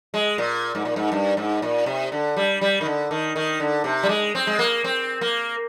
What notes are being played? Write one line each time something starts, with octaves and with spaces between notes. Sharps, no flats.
G#3
A#2
G#2
A#2
G#2
G2
G#2
A#2
C3
D3
G3
G3
D#3
D3
D#3
D#3
D3
C3
G3
G#3
C4
G#3
A#3
C4
A#3